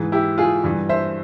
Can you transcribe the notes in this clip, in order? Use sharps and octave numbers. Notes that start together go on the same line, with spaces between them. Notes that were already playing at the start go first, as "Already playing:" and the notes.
Already playing: G#2 E3
E4 G4
F4 G#4
G2 E3
C5 E5